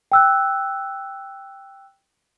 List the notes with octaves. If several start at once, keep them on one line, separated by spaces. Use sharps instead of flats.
G5 E6 F#6